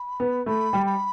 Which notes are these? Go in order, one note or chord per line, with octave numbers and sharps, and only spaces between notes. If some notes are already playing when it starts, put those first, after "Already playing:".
Already playing: B5
B3
A3 B5
G3
B5